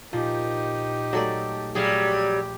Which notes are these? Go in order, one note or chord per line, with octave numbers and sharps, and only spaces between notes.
A#2 F3 D#4 G4
F#3 G#3 A3 A4 D5
A#1 F#3 G3 G4 G#4 F5